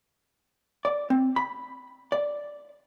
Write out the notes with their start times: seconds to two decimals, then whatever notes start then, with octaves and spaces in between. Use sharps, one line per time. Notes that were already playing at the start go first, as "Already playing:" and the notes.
0.85 D5
1.10 C4
1.36 B5
2.12 D5